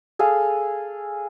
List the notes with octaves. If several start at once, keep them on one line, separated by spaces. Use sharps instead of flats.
G#4 A4 F5